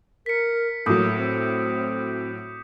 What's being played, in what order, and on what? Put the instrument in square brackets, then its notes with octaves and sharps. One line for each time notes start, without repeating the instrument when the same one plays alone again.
[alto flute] A#4 [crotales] B6 C#7
[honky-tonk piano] A2 F#3 [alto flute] A#3 [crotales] D6 D#6 G6
[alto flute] C4